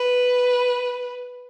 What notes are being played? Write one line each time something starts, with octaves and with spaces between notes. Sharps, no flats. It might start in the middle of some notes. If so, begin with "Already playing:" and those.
Already playing: B4